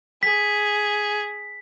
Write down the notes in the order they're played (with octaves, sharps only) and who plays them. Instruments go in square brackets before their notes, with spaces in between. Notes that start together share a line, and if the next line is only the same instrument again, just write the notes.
[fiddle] G#4 [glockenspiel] B6